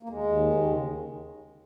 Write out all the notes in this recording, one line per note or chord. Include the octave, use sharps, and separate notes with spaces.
A#3
D#2 G#3
D#2
D#3
D#2
C#3